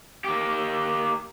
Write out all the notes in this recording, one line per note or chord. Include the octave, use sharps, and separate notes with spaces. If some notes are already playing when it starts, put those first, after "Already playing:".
A#3 G4